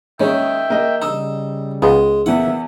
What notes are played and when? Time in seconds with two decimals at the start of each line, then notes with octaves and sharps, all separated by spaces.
0.20 D#2 D#3 G#3 C#4 E5 G5
0.70 A#3 D#5
1.02 C#3 G3 D#4 E6
1.82 C#2 G#3 B3
2.26 E2 E3 A#3 E5 F#5